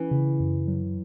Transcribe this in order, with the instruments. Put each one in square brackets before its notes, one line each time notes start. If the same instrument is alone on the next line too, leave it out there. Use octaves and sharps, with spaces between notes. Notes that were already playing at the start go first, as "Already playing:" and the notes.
Already playing: [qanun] E3 [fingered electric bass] C#4
[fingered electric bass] C#3
F#2
F#3